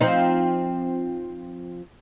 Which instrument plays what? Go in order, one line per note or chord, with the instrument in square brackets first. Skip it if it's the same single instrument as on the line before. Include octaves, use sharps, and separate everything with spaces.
[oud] F3 C4 D#4